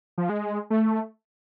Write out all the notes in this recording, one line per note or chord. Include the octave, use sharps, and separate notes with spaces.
F3
G#3
A3